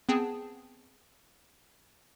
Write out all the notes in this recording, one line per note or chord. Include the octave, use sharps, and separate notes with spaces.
B3 C4 G#4 G5 A5